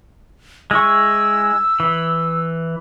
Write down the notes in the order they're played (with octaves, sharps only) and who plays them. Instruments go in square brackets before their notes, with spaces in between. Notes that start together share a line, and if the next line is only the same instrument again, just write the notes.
[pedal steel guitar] G#3 E4 C#6 [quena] E6
[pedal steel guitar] E3